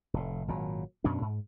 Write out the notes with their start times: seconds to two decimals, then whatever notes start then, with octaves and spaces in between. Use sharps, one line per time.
0.14 F1 A2
0.48 G#1 A#2 F#3
1.04 F#2 B2 C#4 D4
1.22 G#2